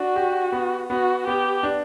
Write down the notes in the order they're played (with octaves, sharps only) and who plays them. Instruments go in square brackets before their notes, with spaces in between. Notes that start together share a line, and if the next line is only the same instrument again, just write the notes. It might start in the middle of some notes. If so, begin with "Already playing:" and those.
Already playing: [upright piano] D4 [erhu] F#4
[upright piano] G4
B3
[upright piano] B3 [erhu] F#4
[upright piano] B3 [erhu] G4
[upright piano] D4